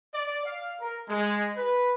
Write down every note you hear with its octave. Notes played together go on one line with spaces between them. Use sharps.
D5
F5
A#4
G#3
B4